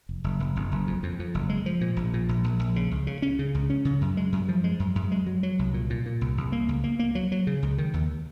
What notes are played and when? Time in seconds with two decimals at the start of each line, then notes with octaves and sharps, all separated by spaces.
0.09 F1
0.24 F#1
0.40 F#1
0.56 F#1
0.71 F#1
0.87 F2
1.03 F2
1.19 F2
1.34 F#1
1.49 G#3
1.66 F3
1.81 A#2
1.97 A#1
2.13 A#2
2.29 A#1
2.44 A#1
2.59 A#1
2.76 C#3
2.91 C#2
3.07 C#3
3.22 C#4
3.39 C#3
3.55 C#2
3.70 C#4
3.85 C#3
4.01 F#2
4.17 G#3
4.32 F#2
4.48 F3
4.64 G#3
4.80 F#2
4.95 F#2
5.12 G#3
5.26 F#3
5.43 F#3
5.59 C2
5.74 A#2
5.90 A#2
6.06 A#2
6.21 C2
6.37 C2
6.52 A#3
6.69 C#2
6.84 A#3
6.99 A#3
7.15 F#3
7.32 F#3
7.47 C#3
7.63 C#2
7.78 D#3
7.94 D#2